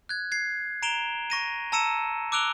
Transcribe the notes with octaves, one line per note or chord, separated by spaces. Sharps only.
F#6 G#6
G#6 C7
A#5 D7 E7 F7 G7
C#6 A#6 D#7
A5 A#5 E6 C#7 D#7 E7
D6 E6 F#6 D7 F7 G7